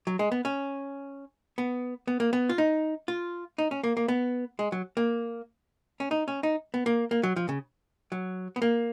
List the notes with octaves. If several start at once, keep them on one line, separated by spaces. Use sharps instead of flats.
F#3
G#3
B3
C#4
B3
B3
A#3
B3
F4
D#4
F4
D#4
C#4
A#3
A#3
B3
G#3
F#3
A#3
C#4
D#4
C#4
D#4
B3
A#3
A#3
F#3
F3
C#3
F#3
B3
A#3